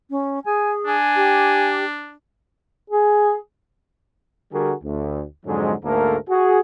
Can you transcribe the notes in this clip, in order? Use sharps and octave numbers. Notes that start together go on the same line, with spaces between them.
C#4
G#4 G#5
D4 G#5
G4
G#4
D3 G3 F#4 G#4 A#4
D2
F2 G#2 D3 F#3 G#3
D2 G#2 A3 A#3 A4 A#4
F#4 G#4